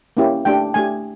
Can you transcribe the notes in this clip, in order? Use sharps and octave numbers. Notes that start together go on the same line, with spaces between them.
A#3 C#4 E4 G4
A3 D4 G4 G5
A3 D4 G4 G#5